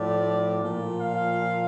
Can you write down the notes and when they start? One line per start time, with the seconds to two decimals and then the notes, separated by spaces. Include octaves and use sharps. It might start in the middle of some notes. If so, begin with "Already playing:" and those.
Already playing: A2 F3 D5
0.62 A#2 F3
0.99 F5